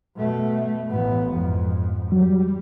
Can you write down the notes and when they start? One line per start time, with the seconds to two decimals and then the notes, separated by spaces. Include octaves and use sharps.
0.17 B2 A3
0.90 A1 B3
1.32 F2 G#2
2.12 F#3 G3